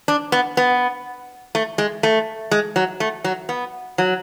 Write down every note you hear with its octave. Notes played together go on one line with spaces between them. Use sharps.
D4
B3
B3
A3
G#3
A3
G#3
F#3
A3
F#3
B3
F#3